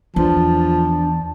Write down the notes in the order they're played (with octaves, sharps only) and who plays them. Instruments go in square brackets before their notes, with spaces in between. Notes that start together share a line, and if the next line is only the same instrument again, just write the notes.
[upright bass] E2 [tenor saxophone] F3 [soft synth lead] D4 [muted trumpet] A5